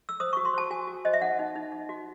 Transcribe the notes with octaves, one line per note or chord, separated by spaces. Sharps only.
E6
C5 D#6
F#4 C#6
C6
C5 A5
F#4 G#5
F#4
C5 D#5
E5
D#4 F#5
D#4
D#4
D#4
F#4